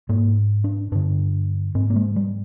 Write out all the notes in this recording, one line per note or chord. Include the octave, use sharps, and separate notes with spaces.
G#2 A#3
D4
G2 D3 D4
G#2 C4
A#3
G#3
G3